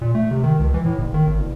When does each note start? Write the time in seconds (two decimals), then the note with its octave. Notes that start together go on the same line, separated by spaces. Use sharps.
0.01 A#2
0.15 A3
0.31 C3
0.44 D#3
0.59 C#2
0.74 E3
0.86 A2
0.99 F#1
1.14 D#3
1.27 G#1
1.40 F#1